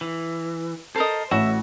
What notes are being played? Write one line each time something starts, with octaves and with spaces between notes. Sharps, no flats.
E3
A4 A#4 C5 D#5
A1 A2 F#4 E5